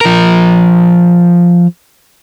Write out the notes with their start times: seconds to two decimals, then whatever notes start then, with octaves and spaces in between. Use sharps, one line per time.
0.01 F3 A#4